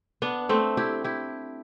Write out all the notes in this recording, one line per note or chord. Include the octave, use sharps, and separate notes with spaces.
B3 D4
A3 C4
E4 G4
E4 G4